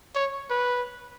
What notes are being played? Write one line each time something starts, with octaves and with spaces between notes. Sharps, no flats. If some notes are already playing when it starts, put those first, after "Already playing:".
C#5
B4